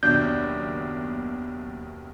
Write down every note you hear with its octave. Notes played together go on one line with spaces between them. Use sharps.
F#1 D#2 B2 D4 G6